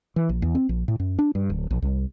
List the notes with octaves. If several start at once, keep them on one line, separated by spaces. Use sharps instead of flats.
E3
A#1
E2
C4
A#1
A2
F#2
D4
G2
D1
A#1
C2